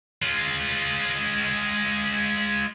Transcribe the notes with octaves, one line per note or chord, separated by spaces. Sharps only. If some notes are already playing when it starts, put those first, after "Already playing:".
G#3 F4